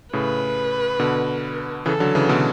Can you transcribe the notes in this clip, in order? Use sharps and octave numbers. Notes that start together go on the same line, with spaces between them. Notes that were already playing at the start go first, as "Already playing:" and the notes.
A2 C#3 B4
B2 D3
C#3 E3 A4
D3 F#3
C#3 E3
B2 D3